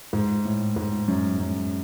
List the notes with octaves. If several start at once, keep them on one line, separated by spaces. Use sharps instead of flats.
G#2
A2
G#2
F#2
F#2